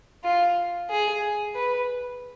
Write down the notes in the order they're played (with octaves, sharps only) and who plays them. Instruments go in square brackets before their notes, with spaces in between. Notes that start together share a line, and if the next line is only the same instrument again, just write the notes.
[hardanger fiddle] F4
G#4
B4